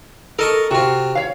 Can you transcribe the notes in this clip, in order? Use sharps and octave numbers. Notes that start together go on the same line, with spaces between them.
A4 A#4 D#5 C#6
C3 F4 F#4
C#5 F5